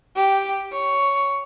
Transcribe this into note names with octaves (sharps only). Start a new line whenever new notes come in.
G4
C#5